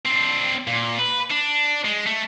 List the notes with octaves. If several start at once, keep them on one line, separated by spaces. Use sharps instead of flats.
C4 D4
A#2
B4
D4
G#3
A3